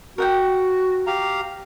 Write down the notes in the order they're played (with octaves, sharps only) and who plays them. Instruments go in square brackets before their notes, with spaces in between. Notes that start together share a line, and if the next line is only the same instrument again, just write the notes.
[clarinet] F#4 [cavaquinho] A#4 F#5 G5
[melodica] G4 F5 A#5